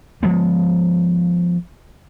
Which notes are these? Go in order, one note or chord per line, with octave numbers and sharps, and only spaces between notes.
F3 G#3 B3